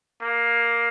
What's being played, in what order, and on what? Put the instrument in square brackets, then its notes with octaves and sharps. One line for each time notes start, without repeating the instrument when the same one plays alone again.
[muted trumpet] A#3